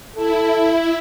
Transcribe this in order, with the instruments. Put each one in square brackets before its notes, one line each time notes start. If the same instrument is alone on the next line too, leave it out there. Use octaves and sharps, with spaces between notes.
[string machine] E4 [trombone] A4